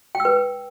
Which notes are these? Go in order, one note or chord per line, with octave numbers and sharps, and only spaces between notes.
G5
E6
B4